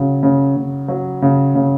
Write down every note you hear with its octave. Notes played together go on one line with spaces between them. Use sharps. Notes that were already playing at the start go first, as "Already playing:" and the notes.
Already playing: C#3 F#3
C#3
C#3
F#3
C#3
C#3